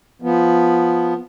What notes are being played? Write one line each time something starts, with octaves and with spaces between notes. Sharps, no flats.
F3 B3